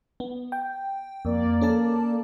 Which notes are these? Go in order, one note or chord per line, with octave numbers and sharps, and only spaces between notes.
B3
G5
F2 A#3 D5
C#4 A4 A5